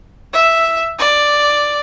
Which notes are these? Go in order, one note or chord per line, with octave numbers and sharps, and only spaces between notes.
E5
D5